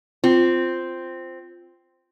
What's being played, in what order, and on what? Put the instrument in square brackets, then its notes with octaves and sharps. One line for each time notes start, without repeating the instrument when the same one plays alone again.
[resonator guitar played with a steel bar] C4 [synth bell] F4